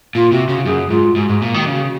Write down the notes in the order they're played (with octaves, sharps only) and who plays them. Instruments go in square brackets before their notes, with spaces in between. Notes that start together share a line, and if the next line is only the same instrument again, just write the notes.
[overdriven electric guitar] A#2 [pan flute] F4
[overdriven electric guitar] C3 [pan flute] F#4
[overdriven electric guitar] C#3 [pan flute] F#4
[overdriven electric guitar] F#2 [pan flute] G#4
[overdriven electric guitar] G#2 [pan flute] F4
[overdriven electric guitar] G#2 [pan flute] F#4
[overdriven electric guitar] G#2
A#2
D#3
C#3